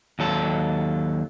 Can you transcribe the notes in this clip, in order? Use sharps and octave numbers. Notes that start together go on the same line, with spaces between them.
D#2 F#3 A4